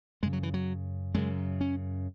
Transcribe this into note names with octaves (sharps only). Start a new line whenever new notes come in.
F#2 C#3 G#3
F#3
E3
F#3
F#2 C#3 G#3
C#4